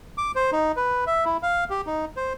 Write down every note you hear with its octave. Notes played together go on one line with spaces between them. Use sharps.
D6
C5
D#4
B4
E5
E4
F5
G4
D#4
C5